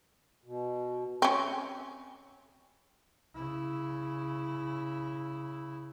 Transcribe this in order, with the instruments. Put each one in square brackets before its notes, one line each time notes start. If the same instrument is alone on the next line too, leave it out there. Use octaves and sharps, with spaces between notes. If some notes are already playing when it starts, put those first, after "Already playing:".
[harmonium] B2
[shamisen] C4 C#4
[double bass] C#3 E4